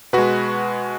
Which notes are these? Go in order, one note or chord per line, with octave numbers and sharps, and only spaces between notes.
B2 G#3 F#4 B4